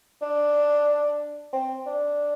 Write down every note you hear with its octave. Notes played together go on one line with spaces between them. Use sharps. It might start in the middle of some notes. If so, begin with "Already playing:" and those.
D4
C4
D4